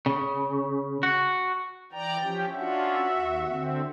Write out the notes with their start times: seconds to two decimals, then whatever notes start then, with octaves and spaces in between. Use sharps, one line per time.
0.06 C#3
1.03 F#4
1.93 E3 D5 G5 A#5
2.22 F3 C#4 G4
2.55 C#4 D4 F4 F#4 E5
3.15 D#2
3.50 D3 C4